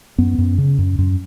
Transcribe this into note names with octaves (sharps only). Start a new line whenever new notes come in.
F#2 B3
F#2
C#3
F#2
F#2